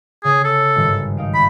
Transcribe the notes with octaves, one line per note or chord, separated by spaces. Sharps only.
C#3 G#4
A4
G#1 G2 D#3
D#4 F5 D7
B5